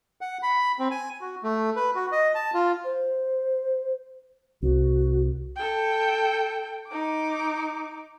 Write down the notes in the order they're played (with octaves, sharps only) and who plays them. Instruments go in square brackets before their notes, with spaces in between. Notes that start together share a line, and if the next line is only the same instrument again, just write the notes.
[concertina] F#5
B5
C4
G#5
F#4
A3
B4
F#4
D#5
A5
F4
[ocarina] C5
[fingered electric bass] C2 [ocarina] F#4
[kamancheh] A4 G5
D#4 D6